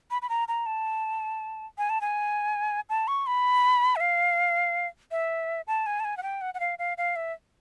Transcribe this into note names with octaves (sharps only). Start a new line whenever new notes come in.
B5
B5
A#5
A#5
A5
G#5
A5
G#5
A5
C#6
B5
E5
F5
E5
A5
G#5
A5
G#5
F#5
G5
F#5
F#5
F5
F5
F5
E5